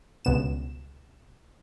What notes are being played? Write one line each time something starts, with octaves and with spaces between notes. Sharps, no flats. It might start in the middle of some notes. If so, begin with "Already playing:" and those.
C#2 G2 B2 E7